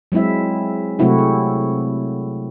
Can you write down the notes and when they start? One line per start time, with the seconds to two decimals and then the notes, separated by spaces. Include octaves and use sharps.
0.12 F#3 G#3 C4 E4 E5
0.99 C3 F#3 A3 C4 E4 F#4
1.19 G#4